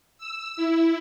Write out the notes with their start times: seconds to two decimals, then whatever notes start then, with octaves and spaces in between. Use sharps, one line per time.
0.18 E6
0.57 E4